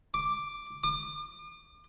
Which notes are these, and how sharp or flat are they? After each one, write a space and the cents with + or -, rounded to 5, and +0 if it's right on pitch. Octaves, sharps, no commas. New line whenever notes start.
D6 +5
D6 +45